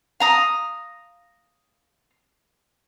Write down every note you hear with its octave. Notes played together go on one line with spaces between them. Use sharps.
F5 A#5 D#6